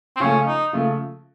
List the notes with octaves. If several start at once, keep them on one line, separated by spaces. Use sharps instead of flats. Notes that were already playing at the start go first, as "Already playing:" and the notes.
C4
C#3 F3 A3 C#4
D#4
C#3 F3 A3